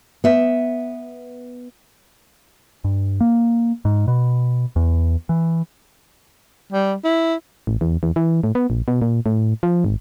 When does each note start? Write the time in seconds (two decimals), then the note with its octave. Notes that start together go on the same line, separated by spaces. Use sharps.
0.24 B3 E5
2.84 G2
3.21 A#3
3.85 G#2
4.08 B2
4.76 E2
5.29 E3
6.72 G3
7.04 E4
7.67 A1
7.81 E2
8.03 E2
8.16 E3
8.44 A2
8.55 B3
8.70 A#1
8.88 B2
9.02 A#2
9.26 A2
9.63 F3
9.84 G#1